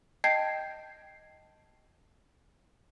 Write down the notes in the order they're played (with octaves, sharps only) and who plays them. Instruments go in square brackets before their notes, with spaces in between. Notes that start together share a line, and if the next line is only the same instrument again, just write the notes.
[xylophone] D#5 G5 A5 G6 G#6 C7